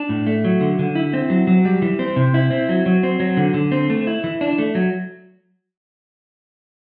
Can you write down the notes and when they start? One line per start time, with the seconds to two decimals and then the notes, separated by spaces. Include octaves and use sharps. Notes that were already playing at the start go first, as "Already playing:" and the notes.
Already playing: D4
0.09 A2
0.27 A3
0.44 F#3
0.61 D3
0.79 D3
0.95 E4
1.14 C4
1.30 F#3
1.47 F#3
1.65 G3
1.82 E3
1.99 C4
2.16 C3
2.34 E4
2.50 C4
2.69 F#3
2.86 F#3
3.03 C4
3.20 F#3
3.37 D3
3.54 D3
3.72 C4
3.90 A3
4.07 E4
4.24 E3
4.41 D4
4.58 A3
4.75 F#3